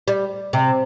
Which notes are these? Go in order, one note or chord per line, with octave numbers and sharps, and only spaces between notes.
G3
C3